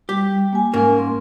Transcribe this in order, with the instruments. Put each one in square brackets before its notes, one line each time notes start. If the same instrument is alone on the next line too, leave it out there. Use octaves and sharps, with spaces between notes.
[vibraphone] G3 [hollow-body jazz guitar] G4
[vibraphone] A#3 G#5
[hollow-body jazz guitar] G#2 A#3 [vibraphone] C#4 A#4
[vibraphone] C6